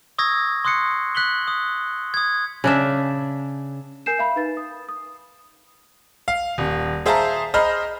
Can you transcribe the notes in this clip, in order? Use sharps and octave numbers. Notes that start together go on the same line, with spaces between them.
C#6 D#6 E6 G#6 A#6
C6 D#6 F#6 C7 C#7
F#6 B6 F#7 G7
D#6
D#6 G#6
C#3 D4 E5
A#4 G#5 G6 C7 E7
E5 F5 B5
D#4 B4 A6
D#6
D#6
F5
D#1
G#4 C5 E5 F5 A5 A#5
G#4 C5 D#5 A#5 B5 F6